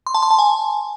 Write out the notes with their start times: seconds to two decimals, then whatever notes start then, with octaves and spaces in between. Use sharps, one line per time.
0.07 C6
0.15 A5
0.23 C6
0.31 A5
0.39 G#5